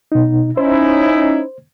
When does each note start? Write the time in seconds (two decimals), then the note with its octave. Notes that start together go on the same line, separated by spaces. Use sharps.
0.12 B2 D#4
0.57 C#4 D#4 E4 C5